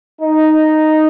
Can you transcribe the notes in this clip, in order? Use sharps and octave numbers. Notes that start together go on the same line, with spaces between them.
D#4